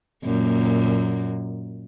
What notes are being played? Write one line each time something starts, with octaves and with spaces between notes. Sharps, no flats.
F#2 A#2 A#3